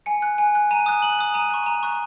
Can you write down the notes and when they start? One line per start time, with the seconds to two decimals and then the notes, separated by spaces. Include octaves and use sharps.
0.06 G#5 C#7
0.22 F#6
0.38 G#5
0.55 F#6
0.71 A#5 D#7
0.86 D#6 F#6
1.02 A#5 F#7
1.19 D#6 F#6
1.34 A#5 D#7
1.50 C#6 F#6
1.66 A#5
1.83 C#6 F#6